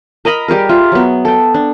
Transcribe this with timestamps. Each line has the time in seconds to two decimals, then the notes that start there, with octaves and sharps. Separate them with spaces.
0.25 A#4 D#5 A#5 B5
0.48 G3 G4 G#4 A#4
0.69 F4 E5
0.92 F#3 B3
1.25 A4 G5
1.54 D4